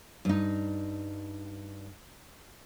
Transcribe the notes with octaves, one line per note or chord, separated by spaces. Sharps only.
G2 D#4